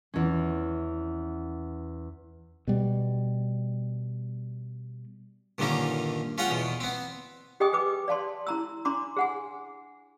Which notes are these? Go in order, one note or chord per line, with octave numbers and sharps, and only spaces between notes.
E2 C#4
B2 G3
G2 A#2 D3 D#3 C#4 D#4
C#4 F4 G#4 F#5 G5
E2 B2
B3 C4
G4 G#4 D#5 G5 G#5 D#6
G#4 B4 D6
D5 F5 A5 C6
E4 A#5 E6
D4 A#5 C6 D6
G#4 F#5 G#5